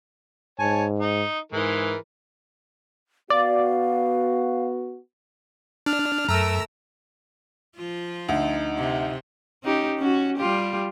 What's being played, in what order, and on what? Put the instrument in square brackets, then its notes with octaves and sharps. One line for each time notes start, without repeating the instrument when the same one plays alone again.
[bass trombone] G#2 [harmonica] C#5 G#5 A5
[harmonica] D#4
[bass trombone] G#2 [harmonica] E3 G#3 A#4
[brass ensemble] B3 F#4 [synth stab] D5 [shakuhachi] F5
[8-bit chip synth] D4 [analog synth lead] F6
[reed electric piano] F#2 [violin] A3 A#4 [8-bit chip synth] A#5 E6
[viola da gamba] F3 F4
[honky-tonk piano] D2 [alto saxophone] D#4
[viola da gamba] C3
C#4 D#4 G4
C#4 F#4
G3 F4 G4